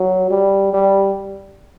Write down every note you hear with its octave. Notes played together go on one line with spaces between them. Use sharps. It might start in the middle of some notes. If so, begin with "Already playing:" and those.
Already playing: F#3
G3
G3